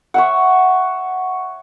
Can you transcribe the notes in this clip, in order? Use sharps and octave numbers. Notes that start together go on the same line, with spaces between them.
C#5 E5 F#5